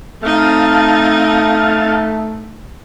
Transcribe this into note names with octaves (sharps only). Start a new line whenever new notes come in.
A3 C4 D#4 F5 A5